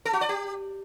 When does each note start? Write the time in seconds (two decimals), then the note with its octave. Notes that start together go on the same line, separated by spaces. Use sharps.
0.05 A4
0.13 F#4
0.21 D5
0.29 G4